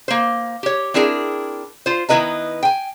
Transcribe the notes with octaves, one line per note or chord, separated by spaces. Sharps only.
A#3 C5
G4 C#5
C4 D4 E4 G#4 A#4
F4 C5
D#3 B3 E4 B4 D#5 A#5
G5 G#5